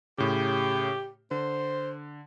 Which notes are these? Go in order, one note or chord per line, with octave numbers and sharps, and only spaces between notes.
A2 C#3 G4
D3 C5